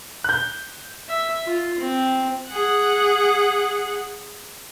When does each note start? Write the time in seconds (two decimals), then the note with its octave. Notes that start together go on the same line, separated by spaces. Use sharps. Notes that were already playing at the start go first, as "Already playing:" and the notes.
0.24 F#6 G6
1.09 E5
1.46 F4
1.80 C4
2.48 G#4 F#5